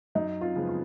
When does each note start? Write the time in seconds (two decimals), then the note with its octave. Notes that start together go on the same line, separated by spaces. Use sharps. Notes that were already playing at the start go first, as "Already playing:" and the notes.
0.15 F#2 D#4
0.41 F4
0.55 C#3 F3 G#3 B3
0.68 F4